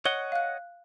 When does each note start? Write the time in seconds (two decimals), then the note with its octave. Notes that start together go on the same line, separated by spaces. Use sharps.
0.05 C#5 D#5 F#5 G7
0.32 F5 F#6